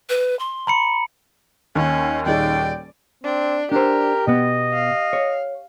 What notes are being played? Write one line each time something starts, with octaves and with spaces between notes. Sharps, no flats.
B4
C6
A#5 B5 C#7
D#2 D#3 C#4
D#1 D#4 G#4 D5 G5
C4 D4
D4 G4 A#4 C5
B2 B3 D#5
F5
C#5